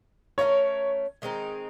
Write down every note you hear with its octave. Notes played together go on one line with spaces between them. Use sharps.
A3 C#4 F4 A#4 C#5
D#3 G#3 C4 D#4